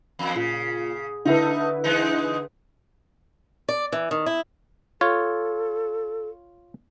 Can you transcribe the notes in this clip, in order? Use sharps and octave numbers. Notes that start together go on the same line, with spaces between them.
E2
A#2 C#3
D3 A3 D#4 E4 B4
E3 G#3 D#4
D5
E3
D#3
E4
F4 A4 C#5